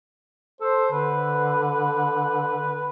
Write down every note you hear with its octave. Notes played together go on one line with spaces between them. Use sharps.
A4 C5
D3 B4